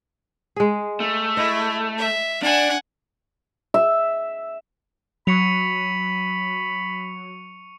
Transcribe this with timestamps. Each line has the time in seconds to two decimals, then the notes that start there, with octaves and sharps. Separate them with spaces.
0.56 G#3 G#4
1.00 A3
1.37 E4 D#5
1.98 E5
2.42 D4 F#5 G#5
3.74 E5
5.27 F#3 B5 C#6 C#7 F7